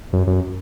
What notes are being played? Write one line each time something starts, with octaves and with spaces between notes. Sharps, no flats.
F#2
F#2